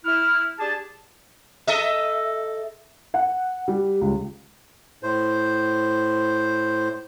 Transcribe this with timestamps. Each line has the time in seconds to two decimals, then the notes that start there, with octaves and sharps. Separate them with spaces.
0.05 E4 F6
0.59 D4 G4 G#4 A5
1.67 A4 D#5 E5
3.14 F#5
3.68 G3
4.01 C#2
5.03 A2 C5